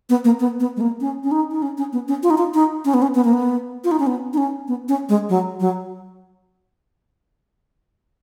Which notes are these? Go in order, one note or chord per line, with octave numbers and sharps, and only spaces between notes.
B3
A#3
B3
B3
G#3
A#3
C#4
C#4
D#4
D#4
C#4
C#4
B3
C#4
F4
D#4
F4
D#4
C#4
B3
C#4
B3
A#3
B3
F4
D#4
C#4
B3
D#4
C#4
B3
C#4
G#3
F#3
F#3